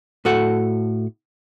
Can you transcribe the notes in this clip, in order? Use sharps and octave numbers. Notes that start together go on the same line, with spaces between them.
A2 F#4 A4 F#5